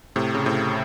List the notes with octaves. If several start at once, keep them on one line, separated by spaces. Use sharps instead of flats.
A2 C3
C#3
A2 C3